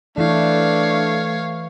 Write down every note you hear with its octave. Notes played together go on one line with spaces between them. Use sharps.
E3 A3 D4 E4 C#5 F5